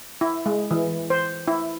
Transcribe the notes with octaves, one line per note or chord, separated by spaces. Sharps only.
E4
G#3
E3
C5
E4